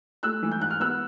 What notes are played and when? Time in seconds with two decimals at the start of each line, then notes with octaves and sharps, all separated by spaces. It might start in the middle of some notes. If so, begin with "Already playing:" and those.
0.23 A3 E6 F#6
0.43 E3
0.51 G6
0.60 G#2 F#6
0.70 F6
0.80 B3 E6 F#6